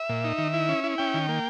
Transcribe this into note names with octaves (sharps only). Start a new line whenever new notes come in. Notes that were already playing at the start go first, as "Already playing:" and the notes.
Already playing: E5
A#2
D#4
D#3
E4
C#4
E4
C#4 G5
D#3
A#3